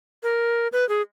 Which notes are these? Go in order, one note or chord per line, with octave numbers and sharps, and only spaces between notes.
A#4
B4
G#4